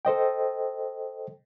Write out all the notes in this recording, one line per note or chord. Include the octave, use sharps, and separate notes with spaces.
A4 C5 D#5 G5